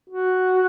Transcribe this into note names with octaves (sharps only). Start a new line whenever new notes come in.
F#4